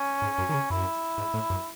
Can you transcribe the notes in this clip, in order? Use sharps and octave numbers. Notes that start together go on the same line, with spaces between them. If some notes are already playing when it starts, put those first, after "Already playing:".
Already playing: C#4
G#2
F#2
D#3
C#3
F#2 E4
G#2
A2
F#2